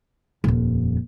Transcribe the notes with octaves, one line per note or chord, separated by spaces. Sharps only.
D#1 F2